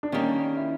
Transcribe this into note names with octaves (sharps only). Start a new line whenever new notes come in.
D4
D#3 G3 A#3 C#4
E4